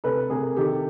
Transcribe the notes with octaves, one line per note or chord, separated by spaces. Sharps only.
C3 A4 B4
C3 G#4 A#4
D#3 G4 A4